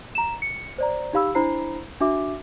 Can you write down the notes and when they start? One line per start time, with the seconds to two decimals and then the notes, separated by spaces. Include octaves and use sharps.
0.15 A#5 E7
0.42 C#7
0.78 C5 D5 A#5
1.13 D#4 G4 F5 B5 E6
1.35 D4 E4 C5 A#5 B5 C7
2.01 D4 F#4 E5 D6